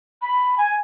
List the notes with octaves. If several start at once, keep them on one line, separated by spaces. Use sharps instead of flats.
B5
G#5